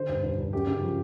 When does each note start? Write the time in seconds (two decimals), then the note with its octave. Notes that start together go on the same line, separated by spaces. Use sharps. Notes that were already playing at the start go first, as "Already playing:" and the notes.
Already playing: D3 C5
0.09 G2
0.24 G2
0.38 G2
0.53 F#2 G4
0.67 C#3
0.82 F3